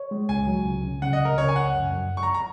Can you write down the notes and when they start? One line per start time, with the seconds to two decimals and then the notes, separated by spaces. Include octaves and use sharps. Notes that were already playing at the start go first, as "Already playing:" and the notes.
Already playing: C#5
0.11 G#3
0.29 C#2 G#5
0.47 F#3
0.65 C#2
0.84 C#3
1.02 C#3 F#5
1.13 D#5
1.20 C#2 A#4
1.38 C#3 C#5
1.48 G#5
1.56 C#2 F#5
1.75 F#2
1.92 F#2
2.11 F#2
2.17 C#6
2.23 A#5
2.34 A#5